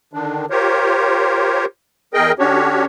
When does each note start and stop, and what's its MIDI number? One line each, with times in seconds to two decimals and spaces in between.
0.13 0.46 50
0.13 0.46 51
0.13 0.46 62
0.50 1.65 65
0.50 1.65 67
0.50 1.65 70
0.50 1.65 72
0.50 1.65 73
2.14 2.32 40
2.14 2.32 68
2.14 2.32 70
2.14 2.32 75
2.14 2.32 79
2.39 2.85 50
2.39 2.85 61
2.39 2.85 62
2.39 2.85 66
2.39 2.85 67
2.39 2.85 73